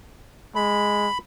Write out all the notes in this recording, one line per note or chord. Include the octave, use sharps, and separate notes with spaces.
G#3 B5